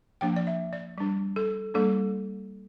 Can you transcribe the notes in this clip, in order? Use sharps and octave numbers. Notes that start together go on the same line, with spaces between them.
F3 A#3 D4 G5
D5
E5
D5
G3 D4
A4
G3 A#3 D4 A4